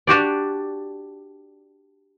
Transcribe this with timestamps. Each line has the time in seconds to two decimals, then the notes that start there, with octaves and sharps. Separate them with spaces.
0.07 D4 F#4 G4 D5